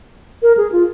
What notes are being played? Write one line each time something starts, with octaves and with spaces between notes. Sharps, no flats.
A#4
G#4
F4